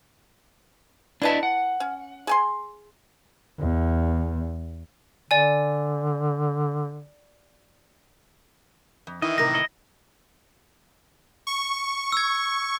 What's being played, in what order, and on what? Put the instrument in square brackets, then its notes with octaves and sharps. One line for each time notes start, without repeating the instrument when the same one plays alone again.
[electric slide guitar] D4 D#5 E5 [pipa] E4 B4 A5
[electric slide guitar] F#5
[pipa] C#4
G#4 G#5 C6
[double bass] E2
[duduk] D3 [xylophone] D5 G#5
[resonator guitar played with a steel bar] F2
[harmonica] D#3 E3 [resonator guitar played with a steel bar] E4 [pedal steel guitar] D#5
[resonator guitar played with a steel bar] A2 C3 A#4 [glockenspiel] A#6
[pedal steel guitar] D#4 E4 D#5
[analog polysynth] C#6
[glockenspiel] E6 G#6